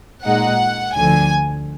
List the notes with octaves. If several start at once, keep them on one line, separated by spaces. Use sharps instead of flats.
A#2 G#3 D#4 F#5
D2 D3 F3 G#5